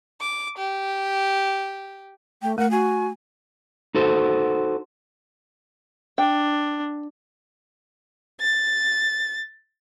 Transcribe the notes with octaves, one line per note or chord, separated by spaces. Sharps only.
D6
G4
A3 G5
A3 A#4 F#5
F#4 G#5
D#4 F#4 A4 C5
D4 G5
A6